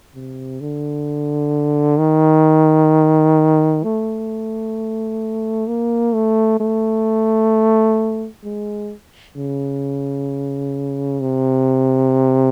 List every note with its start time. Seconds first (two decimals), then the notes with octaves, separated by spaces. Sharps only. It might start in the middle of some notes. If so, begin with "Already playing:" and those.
0.15 C3
0.61 D3
1.99 D#3
3.83 A3
5.68 A#3
6.14 A3
6.60 A3
8.44 G#3
9.37 C#3
11.21 C3